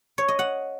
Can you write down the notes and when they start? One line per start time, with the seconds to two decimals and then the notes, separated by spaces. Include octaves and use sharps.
0.18 C#5
0.28 D#5
0.39 F#5